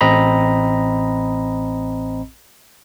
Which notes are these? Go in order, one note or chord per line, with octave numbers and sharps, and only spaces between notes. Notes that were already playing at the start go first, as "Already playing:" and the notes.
A1 C4 D#5 A#5 B5